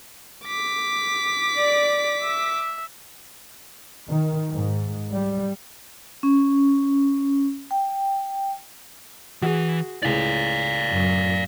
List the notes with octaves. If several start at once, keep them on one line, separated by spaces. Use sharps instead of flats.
D6 B6
D5
E5
D#3
G#2
G3
C#4
G5
E3 F#4 G#4
C#2 A2 D5 F5
F#2